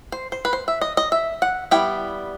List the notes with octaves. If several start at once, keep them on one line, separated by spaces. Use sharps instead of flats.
C5
C5
B4
C5
E5
D#5
D#5
E5
F#5
G3 B3 E4 G5